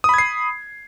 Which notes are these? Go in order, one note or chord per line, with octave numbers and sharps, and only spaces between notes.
B5 D#6 G#6 C7